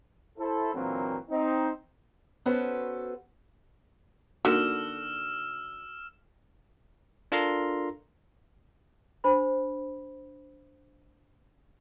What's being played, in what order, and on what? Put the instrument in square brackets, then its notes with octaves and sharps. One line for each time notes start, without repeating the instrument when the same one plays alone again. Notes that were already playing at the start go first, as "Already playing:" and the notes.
[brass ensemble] E4 A4 C5
A#2 D3 E3 F#3 A#3 C4
C4 D#4
[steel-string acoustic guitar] B3 C#4 F#4 A4 B4 C5
[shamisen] D3 [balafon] A#3 D#4 A#4 [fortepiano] F#4 [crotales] E6 F6 E7
[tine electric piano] D4 F4 A4 A#4 A#5 C6
[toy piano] D4 C5 B5